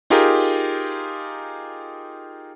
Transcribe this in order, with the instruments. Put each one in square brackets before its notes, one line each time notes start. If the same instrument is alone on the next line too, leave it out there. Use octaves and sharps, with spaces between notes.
[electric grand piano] D#4 F4 G4 G#4 A#4